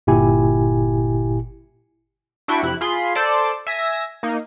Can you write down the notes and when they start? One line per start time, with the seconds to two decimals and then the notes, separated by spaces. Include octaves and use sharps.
0.07 G1 A#2 E4 G4 G#5
2.48 D4 E4 F#4 G5 C#6 B6
2.63 F2 C3 E4 F#6
2.81 F4 G#4 B5 C6
3.15 A4 C5 D5 A5
3.67 E5 G#5 A#6
4.23 A#3 D#4